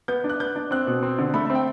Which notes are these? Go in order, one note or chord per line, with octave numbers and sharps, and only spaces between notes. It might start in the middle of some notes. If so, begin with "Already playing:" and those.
B3 G6
D4
F#6
B3 G6
D4
C4 F#6
B2
C4
D3
A3 B5
C4 E5
G5